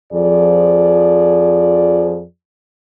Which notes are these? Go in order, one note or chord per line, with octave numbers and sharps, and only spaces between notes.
F2 F3 G#4 D5